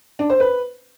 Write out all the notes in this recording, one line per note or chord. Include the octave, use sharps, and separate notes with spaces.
D4
C5
B4